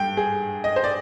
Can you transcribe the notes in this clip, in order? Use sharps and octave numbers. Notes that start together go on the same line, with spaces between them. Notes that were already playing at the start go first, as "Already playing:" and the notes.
Already playing: G2 G5
G#4
D#5
C5
D5